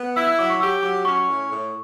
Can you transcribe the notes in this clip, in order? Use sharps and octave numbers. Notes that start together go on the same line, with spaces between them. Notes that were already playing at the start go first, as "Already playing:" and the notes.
Already playing: B3
E4 E6
E6
F#3 D6
C#6
G4 E6
F#3 D6
C#4 C#6
A2
A2